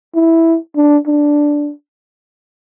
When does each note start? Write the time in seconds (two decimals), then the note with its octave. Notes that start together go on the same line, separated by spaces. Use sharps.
0.15 E4
0.76 D4
1.07 D4